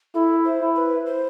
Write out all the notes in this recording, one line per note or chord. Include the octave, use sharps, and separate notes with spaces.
E4 A4
C5
E4
B4
C5